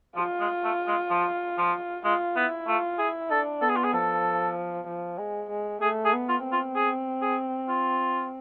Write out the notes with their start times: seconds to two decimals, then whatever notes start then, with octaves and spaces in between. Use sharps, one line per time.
0.16 F3 F4
0.40 G#3
0.64 A3
0.87 G#3
1.10 F3
1.58 F3
2.04 G#3 F4
2.36 B3 E4
2.67 A3 F4
2.99 E4 G#4
3.30 D4 A4
3.61 B3 A4
3.69 G#4
3.76 F4
3.84 G#4
3.93 F3 A4
4.87 F3
5.18 G#3
5.50 G#3
5.81 A3 G#4
6.05 G#4
6.13 B3
6.29 F4
6.44 C4
6.52 F4
6.75 G#4
7.22 G#4
7.69 F4